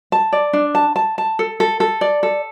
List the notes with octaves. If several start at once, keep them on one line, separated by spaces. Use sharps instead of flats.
A5
D5
D4
A5
A5
A5
A4
A4
A4
D5
A4